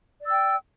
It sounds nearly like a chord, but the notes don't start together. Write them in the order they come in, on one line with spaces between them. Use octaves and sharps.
D5 E6 G5